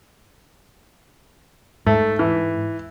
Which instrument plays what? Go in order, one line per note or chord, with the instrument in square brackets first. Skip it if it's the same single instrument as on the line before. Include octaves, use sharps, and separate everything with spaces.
[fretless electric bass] G#2 [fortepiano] A3
[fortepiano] E3